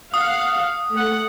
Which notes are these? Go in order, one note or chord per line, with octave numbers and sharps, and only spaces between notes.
F5 F#5 D#6
A3 F#5